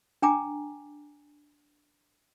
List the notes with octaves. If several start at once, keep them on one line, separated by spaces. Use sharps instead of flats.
D4 G5 G#5 A#5 D6